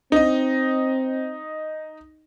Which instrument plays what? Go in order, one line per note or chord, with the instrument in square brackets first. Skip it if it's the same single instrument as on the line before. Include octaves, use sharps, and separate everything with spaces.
[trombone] C4 [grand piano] D#4 D#5